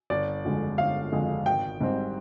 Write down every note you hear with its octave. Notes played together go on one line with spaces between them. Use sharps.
G1 D5
F2 D3 G#3
G1 F5
F2 D3 G#3
G#1 G5
G#2 G3 C4